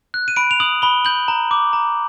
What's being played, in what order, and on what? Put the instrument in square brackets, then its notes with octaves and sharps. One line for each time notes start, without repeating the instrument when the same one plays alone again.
[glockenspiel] F#6
D#7
B5 D7
F7
D#6 F#7
B5 G7
G6 F#7
A#5
D6
A#5